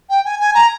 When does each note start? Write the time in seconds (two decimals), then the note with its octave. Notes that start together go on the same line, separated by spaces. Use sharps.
0.10 G5
0.25 G#5
0.40 G#5
0.55 A#5